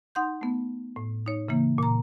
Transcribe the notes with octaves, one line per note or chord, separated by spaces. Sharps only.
D#4 F#5 C6 G6
A3 B3
A2
D#4 C#5
C#3 E3 A#3
A#2 A#5